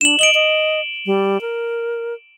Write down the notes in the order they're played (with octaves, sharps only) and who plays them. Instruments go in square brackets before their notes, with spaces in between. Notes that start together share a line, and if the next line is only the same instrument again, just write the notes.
[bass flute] D4 [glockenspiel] E7 F#7
[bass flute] D#5 [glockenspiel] D7 F#7 G7
[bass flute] D#5
G3
A#4